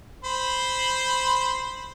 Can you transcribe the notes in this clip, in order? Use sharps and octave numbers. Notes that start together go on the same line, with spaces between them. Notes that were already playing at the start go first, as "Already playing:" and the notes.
C5 B5